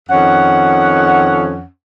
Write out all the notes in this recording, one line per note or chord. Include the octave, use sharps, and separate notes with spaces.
F2 D#3 C#4 F#5